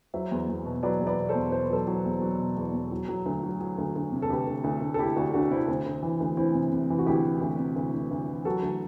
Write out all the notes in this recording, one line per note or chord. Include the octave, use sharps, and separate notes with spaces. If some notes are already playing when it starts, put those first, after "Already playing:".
F#3 C5 E5
E2
E2
B2
F#3 B4 D5
E2
B4 D5
B2
A4 C5
E2
B2 C5
B4
F#3 A4 C5
F#3
E2
F#3
B2
E2
E2
F#3
F#3
D2
F#3
F#3
D2
D2
C3
A4
D2 G4 B4
D2
D2
D2
A4
D2 E4 G4
D2 D4 F#4
D2 D4 F#4
C3 C4 E4
D2 C4
D2
E3
D2
E3 C4 E4
C3
C3
E3
F#4
D2 E4 G4
E3
D2
C3
D2
D2
D2
E3
F#3 F#4 A4
D2